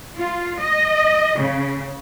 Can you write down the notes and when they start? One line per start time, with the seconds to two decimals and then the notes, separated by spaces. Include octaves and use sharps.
0.19 F4
0.60 D#5
1.39 C#3